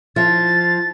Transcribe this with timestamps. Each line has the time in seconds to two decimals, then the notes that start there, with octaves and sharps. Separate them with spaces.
0.16 F3 A6